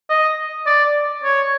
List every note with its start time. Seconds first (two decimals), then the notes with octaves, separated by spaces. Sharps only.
0.10 D#5
0.66 D5
1.24 C#5